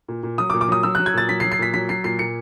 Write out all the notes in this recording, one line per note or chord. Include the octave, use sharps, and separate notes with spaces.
A#2
A#2
F#3 D#6
D6
A#2
D6
F#3 D#6
F#3 E6
F#6
F#3
G#6
A#2 A6
F#3 B6
C7
F#3
C7
A#2 B6
F#3 B6
F#3 C7
A#2 C7
A#2 C#7